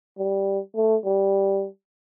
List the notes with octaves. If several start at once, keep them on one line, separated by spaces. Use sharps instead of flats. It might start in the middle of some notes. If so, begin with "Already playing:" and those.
G3
A3
G3